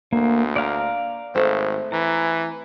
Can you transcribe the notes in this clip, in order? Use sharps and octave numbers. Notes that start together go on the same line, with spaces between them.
D2 A#3
D5 F5 A#5
G#1 A3 C4
E3 A#5